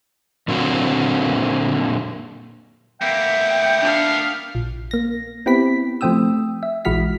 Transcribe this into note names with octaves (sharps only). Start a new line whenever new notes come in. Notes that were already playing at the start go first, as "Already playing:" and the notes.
A#2 D3 F#3 A#3 C4 F#4
A#3 B3 E5 G5
D4 F5
A#1
A#3 A#6
B3 C4 E4 G4 B5 B6
F3 A3 C4 G5 D#6 E6
E5
A#1 E3 G#3 F#4 F6 B6